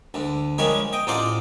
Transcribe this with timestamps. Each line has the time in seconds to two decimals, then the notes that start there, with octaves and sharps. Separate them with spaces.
0.14 D2 D3
0.58 F3 G3 G#3 A#4 C#5
0.93 D#5 G5
1.07 A1 D#4 F4 C5 D5 F#5